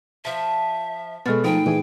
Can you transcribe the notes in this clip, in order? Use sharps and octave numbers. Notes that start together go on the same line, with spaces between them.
F3 E5 A5
B2 D#3 F#3 G#3 B3 A4 F6 A6
F3 A3 D#4 G#4 A#4 B4 G5
A#2 E3 G#4 B4